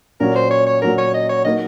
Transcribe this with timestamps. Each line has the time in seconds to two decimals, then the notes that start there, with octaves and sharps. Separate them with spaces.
0.20 A#2 F#3 C#4 A#4
0.35 C5
0.51 C#5
0.67 C#5
0.82 A#2 F#3 C#4 A#4
0.98 C#5
1.14 D#5
1.29 C#5
1.45 F#3 A#3 D#4 D#5